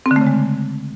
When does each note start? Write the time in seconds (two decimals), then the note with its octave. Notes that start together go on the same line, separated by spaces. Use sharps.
0.06 C4
0.11 D3
0.16 A3
0.21 C#3
0.27 G#3